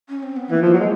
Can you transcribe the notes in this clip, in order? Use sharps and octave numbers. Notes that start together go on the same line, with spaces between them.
C#4
C4
B3
E3 A#3
F3
F#3
G#3